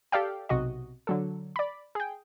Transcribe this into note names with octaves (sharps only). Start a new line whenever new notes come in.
G4 A4 D5 F5 G5
B1 C3 F#4 D#5
D3 F#3 A4
D5 B5
G#4 G5